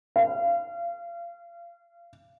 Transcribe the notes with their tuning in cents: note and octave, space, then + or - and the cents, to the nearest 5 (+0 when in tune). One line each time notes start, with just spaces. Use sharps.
F5 -30